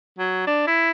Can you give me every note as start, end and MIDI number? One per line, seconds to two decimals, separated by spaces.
0.18 0.43 54
0.47 0.66 62
0.67 0.91 64